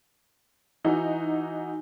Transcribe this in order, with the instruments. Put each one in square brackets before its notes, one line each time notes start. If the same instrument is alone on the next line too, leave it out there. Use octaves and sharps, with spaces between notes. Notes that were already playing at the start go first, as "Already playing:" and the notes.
[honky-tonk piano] E3 D#4 F#4